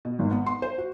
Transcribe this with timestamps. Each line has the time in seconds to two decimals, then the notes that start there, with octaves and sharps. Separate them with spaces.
0.05 B2
0.19 G#1
0.31 B3
0.46 C6
0.62 C5
0.78 F#4